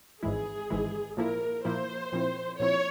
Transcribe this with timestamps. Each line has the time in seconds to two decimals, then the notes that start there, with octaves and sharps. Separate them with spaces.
0.22 G#1 G#2 E3 G#3 E4 G#4
0.70 G#1 G#2 E3 G#3 E4
1.17 A#2 F3 A#3 E4 A#4
1.65 A#2 F3 A#3 E4 C5
2.12 A#2 F3 C4 E4
2.59 A#2 F3 C4 E4 C#5